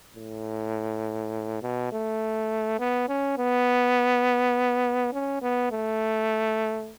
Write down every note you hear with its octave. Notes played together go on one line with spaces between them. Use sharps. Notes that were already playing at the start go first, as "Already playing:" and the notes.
A2
B2
A3
B3
C#4
B3
C#4
B3
A3